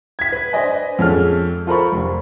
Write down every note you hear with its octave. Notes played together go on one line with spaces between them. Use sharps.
G#6 B6
B4
B4 C5 D5 D#5 G#5
F2 G#3 C#4 A4 F6
F4 A4 A#4 C5 B5 C#6
F1